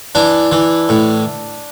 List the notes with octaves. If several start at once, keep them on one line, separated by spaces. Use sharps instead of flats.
E3 D4
E3
A2